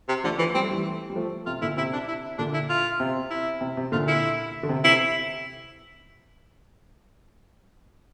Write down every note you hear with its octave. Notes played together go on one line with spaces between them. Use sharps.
C3
D3 F3 A3
E3 F3 A3
G3 C4
A3
E3 G3
G3
F3 A3
C3 F4
A#2 D3 E4
C3 E4
D4
E4
A#2 D3 D4
E4
F4
C3
E4
C3
C3
A#2 D3 F4
E4
D3
C3
C3 E4